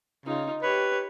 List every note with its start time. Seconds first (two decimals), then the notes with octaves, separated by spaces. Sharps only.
0.26 C#3 D#4 F4
0.62 G4 B4 C#5